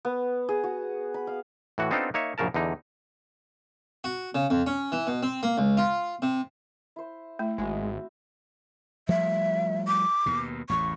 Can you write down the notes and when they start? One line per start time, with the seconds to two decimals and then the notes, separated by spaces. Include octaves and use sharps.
0.05 B3
0.49 G#4
0.64 F#4
1.14 B5
1.27 F5
1.78 A2 E3 F#4
1.91 B3 C4 D4 D#4 F4 A4
2.14 A#3 D#4 C#5 E5
2.38 A#1 F#2 C#3 A#4 A5
2.54 E2 D3 D#4
4.04 F#4
4.35 C#3
4.50 F2
4.67 C#4
4.92 E3
5.07 B2
5.23 C4
5.43 A#3
5.58 C#2
5.77 F4
6.22 C3
6.96 E4 C5
7.39 A3 E4
7.58 G#1 G#3 C4 F#4
9.09 F3 G3 A3 E5
9.87 D6
10.26 D#2 B2
10.69 A1 E2 A2 C#6